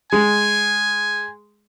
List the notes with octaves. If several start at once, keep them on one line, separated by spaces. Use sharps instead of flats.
G#3 G#5